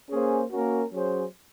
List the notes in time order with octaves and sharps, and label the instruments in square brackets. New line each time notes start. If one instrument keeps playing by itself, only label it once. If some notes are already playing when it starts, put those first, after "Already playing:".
[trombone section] A#3 C#4 G#4 C5
A#3 C#4 F#4 A#4
F#3 C#4 G#4 C5